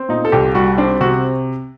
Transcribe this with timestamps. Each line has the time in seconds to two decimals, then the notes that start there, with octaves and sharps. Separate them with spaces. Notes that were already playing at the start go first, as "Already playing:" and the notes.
Already playing: C4
0.09 A#2 D#4
0.25 A4
0.32 C2 G4
0.55 G3 F#4
0.77 C4 D4
1.01 C3 F#4